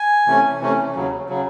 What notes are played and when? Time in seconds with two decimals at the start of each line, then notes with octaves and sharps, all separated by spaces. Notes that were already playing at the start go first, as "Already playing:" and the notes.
Already playing: G#5
0.26 C3 E3 A3 C#4
0.61 C3 E3 A3 C#4
0.95 D#2 C#3 F#3
1.29 C#3 F#3